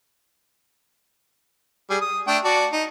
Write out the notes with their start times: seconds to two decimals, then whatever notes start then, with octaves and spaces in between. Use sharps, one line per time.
1.90 G3 G#4
2.01 D#6
2.28 A3 D4 G5
2.45 F#4 D5 A5
2.72 D#4